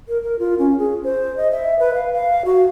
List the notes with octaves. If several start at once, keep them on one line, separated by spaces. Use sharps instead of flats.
A#4
A#4
F4
C#4
G#4
C5
D#5
E5
B4
F5
F5
F#4